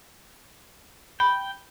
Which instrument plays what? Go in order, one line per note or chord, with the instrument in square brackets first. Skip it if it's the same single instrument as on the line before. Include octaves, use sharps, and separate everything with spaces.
[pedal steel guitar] G5 [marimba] B5